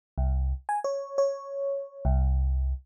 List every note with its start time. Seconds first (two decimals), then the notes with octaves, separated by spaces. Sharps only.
0.18 C2
0.69 G#5
0.84 C#5
1.18 C#5
2.05 C2